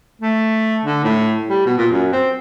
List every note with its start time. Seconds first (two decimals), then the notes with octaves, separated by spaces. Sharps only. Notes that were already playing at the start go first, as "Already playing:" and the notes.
0.22 A3
0.86 D3
1.04 A2
1.49 G3
1.66 B2
1.78 A#2
1.91 F#2
2.13 C4